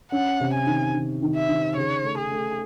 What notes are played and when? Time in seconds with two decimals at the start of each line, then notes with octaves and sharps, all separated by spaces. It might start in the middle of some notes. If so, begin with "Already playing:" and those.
0.12 C#4 F#5
0.40 C3
0.53 G#5
0.67 D#3
0.95 D#3
1.22 D#3
1.36 E5
1.49 D#3
1.76 C#3 C#5
2.04 A3
2.18 G#4
2.32 A3